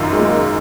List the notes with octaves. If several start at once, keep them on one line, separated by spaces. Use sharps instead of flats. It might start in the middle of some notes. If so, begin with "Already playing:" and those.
Already playing: F#2 D#3 F4
G#3
A#3